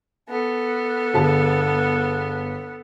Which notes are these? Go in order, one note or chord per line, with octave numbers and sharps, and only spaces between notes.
B3 A4
G1 G#4 A5